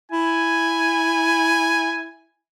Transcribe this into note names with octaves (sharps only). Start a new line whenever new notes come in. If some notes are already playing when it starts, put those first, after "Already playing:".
E4 G#5